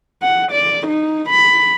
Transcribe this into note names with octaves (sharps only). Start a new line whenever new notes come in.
F#5
D5
D#4
B5